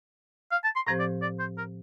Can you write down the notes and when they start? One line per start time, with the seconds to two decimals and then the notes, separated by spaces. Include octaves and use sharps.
0.52 F5
0.64 A5
0.76 C6
0.87 A2 F3 C4 G4 C5 A#5
1.00 D5
1.22 D5
1.40 C5
1.58 A#4